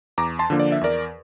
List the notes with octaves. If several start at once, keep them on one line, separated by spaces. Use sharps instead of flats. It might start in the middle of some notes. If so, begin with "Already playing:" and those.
E2 A#5 D6
A5 C6
D3 F3 A#3 D4
D5
E5
E2 A#4 D5